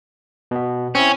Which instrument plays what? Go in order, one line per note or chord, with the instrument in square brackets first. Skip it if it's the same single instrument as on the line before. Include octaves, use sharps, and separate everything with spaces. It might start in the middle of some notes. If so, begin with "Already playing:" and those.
[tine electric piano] B2 B3
[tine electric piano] C4 E4 [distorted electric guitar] C#4